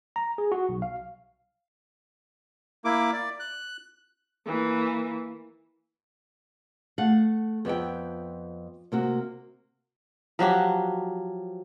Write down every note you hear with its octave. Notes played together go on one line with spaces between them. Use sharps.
A#5
G#4
F#4
B1
F5
A#3 E4 D6
D5
F#6
E3 A#3
A3 F5 F#5
F2 B3 E5 G5
C3 A#3 F#4
F3 F#3 F#4 G4